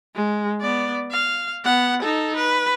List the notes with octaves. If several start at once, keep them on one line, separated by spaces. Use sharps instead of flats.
G#3
B3 D5
F5
B3 F#5
D#4 A4
B4